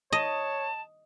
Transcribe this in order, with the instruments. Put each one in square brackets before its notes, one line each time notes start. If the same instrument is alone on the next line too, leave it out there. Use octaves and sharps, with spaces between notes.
[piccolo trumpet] C#5 [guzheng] D#5 [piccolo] A5